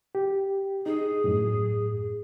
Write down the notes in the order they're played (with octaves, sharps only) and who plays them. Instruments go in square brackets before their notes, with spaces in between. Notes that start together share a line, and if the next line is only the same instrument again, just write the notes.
[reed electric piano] G4
[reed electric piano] D#4 [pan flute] G#4
[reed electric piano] F#2 A2